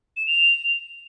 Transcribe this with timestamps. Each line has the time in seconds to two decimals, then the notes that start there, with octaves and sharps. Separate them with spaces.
0.17 E7
0.27 F7